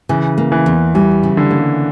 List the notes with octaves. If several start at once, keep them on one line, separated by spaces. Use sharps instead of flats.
C#3 E3
A#3
E3
E2
E3 G3
C#3
D3
A#3